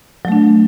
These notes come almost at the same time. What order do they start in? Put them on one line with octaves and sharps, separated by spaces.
F#3 A3 D4